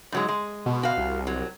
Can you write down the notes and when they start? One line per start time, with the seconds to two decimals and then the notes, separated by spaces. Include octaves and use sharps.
0.12 G#2 F#3 G#3
0.29 G#3
0.66 B2
0.83 F#4 F5
0.97 C2
1.27 F#3